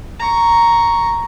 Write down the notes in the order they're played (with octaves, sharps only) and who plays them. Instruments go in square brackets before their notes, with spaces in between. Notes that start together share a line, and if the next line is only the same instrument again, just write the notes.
[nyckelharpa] A#5 C#6